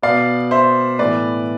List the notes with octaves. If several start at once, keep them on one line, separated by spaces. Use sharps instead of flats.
B2 B3 D5 F5
C5 E5
A2 E3 B3 B4 D5